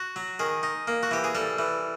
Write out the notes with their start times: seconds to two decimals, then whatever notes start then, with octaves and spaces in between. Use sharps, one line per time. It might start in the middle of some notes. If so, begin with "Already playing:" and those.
Already playing: F#4
0.16 F#3
0.39 D#3 G#4
0.63 D#4
0.87 A#3
1.03 F#4
1.11 E3 G4
1.24 G#4
1.35 G3 A4
1.59 E3